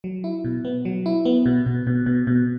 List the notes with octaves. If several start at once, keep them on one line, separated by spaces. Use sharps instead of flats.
F#3
E4
B2
B3
F#3
E4
B3
B2
B2
B2
B2
B2